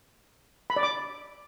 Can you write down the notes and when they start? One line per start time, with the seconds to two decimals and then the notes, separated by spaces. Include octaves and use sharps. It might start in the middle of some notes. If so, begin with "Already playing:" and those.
0.70 B5
0.76 D5
0.83 D6